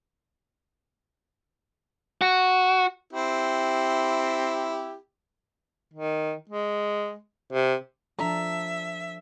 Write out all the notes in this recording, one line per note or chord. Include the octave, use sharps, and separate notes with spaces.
F#4
C4 E4 G4
D#3
G#3
C3
F3 D4 A4 E5 A#5